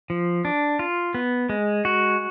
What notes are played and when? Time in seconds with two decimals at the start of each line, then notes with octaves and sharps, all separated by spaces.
0.10 F3
0.45 D4
0.79 F4
1.14 B3
1.49 G#3
1.85 F#4